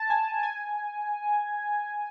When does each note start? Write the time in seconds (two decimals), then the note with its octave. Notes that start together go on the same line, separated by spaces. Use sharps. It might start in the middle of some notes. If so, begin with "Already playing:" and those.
Already playing: A5
0.10 G#5
0.43 G#5